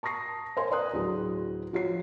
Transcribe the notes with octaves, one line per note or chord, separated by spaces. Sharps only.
A5 C#6 D#6 A#6 C7
A#4 C5 C#5 F5 G#5 C6
B4 D5 C6 D#6 F#6
D2 A2 F#3 G#4
F3 F#4 C#5 C7